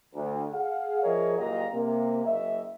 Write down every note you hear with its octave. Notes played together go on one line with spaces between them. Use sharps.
D2
G#4 F5 F#5
F3 G#4 A#4 C#5 D#5 E5
F#1 A#2 G4 D#5 F5 A#5
C3 A#3
F#1 F#2 D#5 E5